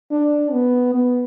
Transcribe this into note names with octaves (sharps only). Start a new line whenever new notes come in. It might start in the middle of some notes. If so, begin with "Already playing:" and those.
D4
B3
B3